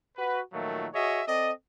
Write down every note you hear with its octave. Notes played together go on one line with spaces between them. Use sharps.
F#4 B4
A#2 D#3 F3 F#3 A3
F#4 G#4 C#5 D#5 E5
C4 A4 D5 D#5